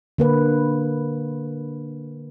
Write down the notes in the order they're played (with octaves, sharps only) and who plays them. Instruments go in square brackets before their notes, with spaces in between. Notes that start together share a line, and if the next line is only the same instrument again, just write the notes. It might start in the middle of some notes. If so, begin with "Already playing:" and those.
[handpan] D3 A#3 B4